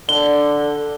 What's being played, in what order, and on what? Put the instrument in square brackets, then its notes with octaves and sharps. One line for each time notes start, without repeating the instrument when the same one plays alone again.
[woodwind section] D3 [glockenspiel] G7